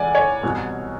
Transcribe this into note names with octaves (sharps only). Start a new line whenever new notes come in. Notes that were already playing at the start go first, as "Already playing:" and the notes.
Already playing: C#2 C#3 E3 D5 F#5 G#5
C#5
C2 B2 F#3